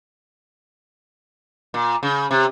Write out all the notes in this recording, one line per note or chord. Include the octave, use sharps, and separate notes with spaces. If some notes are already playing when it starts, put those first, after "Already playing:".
A#2
C#3
C3